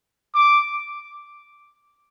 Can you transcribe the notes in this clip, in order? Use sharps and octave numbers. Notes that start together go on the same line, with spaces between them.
D6